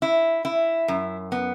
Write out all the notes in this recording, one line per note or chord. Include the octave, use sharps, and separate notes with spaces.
E4
E4
F#2
B3